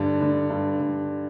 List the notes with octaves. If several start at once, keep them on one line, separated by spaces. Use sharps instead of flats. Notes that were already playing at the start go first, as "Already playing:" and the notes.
Already playing: G2 D3
D3
G2
D3